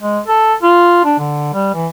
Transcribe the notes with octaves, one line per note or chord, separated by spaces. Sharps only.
G#3
A4
F4
D4
D3
G3
E3